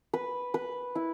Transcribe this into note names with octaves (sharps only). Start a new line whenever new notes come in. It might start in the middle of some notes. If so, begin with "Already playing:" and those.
B4
B4
E4